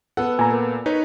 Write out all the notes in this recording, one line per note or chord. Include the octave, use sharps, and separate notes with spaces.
B3 A4 F#5
A#2 G#5 A#5
A#4
D#4 B4 C#5